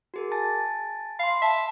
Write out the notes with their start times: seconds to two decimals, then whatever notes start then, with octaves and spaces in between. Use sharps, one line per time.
0.14 F#4 G#4 A#4
0.32 G#5 A5 A6
1.19 F5 B5 C6
1.42 E5 A5 B6